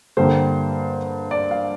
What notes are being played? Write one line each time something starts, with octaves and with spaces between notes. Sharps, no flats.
G2 D3 G3 A#3 C5
D5
F5